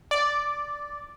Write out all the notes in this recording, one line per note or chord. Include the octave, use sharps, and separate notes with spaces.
D5